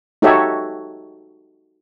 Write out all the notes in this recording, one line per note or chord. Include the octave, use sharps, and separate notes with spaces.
D#4 F#4 G4 A4 C#5 E5